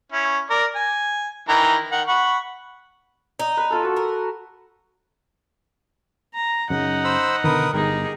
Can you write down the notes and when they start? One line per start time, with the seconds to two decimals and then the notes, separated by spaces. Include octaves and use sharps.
0.12 C#4 E4
0.50 A#4 D5
0.75 G#5
1.49 D#3 E3 A#5
1.92 D#3 F#5
2.08 F#5 B5 C#6
3.39 D#4
3.57 B4
3.70 F4 A4
3.83 F#4 A4
3.96 A#4
6.34 A#5
6.70 F#2 C#3 D#4 F#5
7.04 C5 B5 E6
7.44 B2 D3 D#3 A#4 B4 D#6
7.73 G1 D#4 G4 G#4 A#4